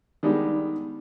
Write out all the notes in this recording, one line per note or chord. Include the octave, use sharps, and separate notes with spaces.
D#3 G3 G#3 B3 D4